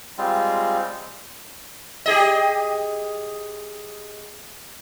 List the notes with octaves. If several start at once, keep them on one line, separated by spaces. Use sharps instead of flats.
G3 G#3 C4 F4
G4 G#4 D#5